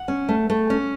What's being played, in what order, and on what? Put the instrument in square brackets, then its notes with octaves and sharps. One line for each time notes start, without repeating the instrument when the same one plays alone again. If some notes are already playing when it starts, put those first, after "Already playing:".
Already playing: [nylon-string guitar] F#5
C#4
A3
A3
C#4